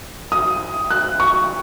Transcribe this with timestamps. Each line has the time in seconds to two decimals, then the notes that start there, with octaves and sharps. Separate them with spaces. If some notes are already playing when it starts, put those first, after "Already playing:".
0.32 D#6
0.91 F#6
1.20 C#6